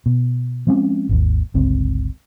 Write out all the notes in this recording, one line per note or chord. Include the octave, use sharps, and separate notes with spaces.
B2
F3 G#3 C4 C#4
G#1 D#2
G1 C#2 C4